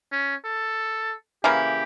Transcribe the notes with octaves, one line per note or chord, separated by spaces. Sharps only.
C#4
A4
C#3 E3 A#3 E4 G4